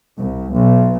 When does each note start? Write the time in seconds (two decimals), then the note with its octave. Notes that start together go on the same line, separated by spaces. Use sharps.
0.17 C2
0.54 B1